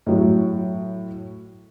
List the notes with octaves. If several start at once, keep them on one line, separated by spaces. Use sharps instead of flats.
A2 F#3